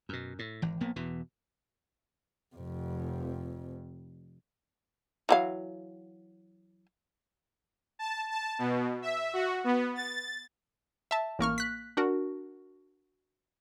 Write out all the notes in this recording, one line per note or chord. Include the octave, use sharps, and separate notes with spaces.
F#2 B2
A2
G#1 E3
A#1 A#3 B3
E2 B2 E3
F1 F2
E3 F#3 F5
A5
A5
B2
E5
F#4
B3
A6
E5 A5
A1 A#3 C#6 F6
F#6 B6
D4 F#4 A#4